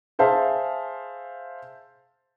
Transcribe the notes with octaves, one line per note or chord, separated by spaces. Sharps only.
G#4 C5 E5 F5 A5